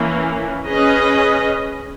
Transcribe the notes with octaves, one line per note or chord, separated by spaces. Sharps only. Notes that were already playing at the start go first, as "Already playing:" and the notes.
Already playing: E3 A#3 C#4
C#4 G#4 B4 D#5